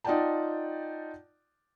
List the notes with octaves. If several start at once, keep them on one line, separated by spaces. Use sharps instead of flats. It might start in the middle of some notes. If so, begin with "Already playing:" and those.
D#4 F4 D5 F#5 G5 A5